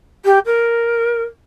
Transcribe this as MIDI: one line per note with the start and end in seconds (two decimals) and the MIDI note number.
0.25 0.39 67
0.46 1.23 70